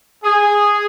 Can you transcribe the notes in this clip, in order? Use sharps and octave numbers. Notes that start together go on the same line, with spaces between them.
G#4